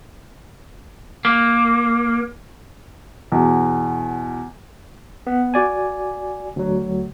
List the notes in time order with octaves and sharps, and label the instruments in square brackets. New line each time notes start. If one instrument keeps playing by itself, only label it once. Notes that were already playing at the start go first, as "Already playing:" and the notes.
[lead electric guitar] A#3
[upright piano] E2 B2
[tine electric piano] B3
F#4 D5 G#5
D2 F#3